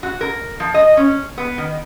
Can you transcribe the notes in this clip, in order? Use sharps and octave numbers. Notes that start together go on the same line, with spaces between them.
F#4
A#4
F3
D#5
C#4
B3
D#3